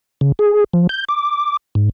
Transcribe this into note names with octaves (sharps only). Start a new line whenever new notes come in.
C#3
G#4
F3
G6
D6
G#2